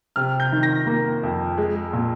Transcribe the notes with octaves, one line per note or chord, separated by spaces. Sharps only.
C3 F6
G6
D#3
A#6
A#3
F2
G#3
A#2